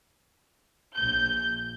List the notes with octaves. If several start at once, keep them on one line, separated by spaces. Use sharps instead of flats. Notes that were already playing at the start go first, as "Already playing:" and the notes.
A#1 G6